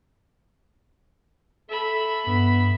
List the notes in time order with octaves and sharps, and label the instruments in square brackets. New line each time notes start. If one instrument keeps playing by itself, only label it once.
[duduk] A4 [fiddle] E5 B5
[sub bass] G2 [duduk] B3